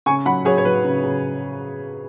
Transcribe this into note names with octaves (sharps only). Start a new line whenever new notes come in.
C#3 G#5 C#6
F#3 F#5 B5
F#3 G#4 C#5
C#5
F#3 B4
C#3
C#3